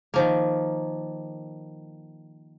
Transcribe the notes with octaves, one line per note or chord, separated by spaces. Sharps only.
D#3 F3 A#3